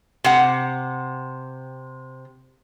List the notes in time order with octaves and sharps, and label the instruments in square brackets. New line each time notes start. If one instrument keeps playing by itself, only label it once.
[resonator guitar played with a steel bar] C3 F#5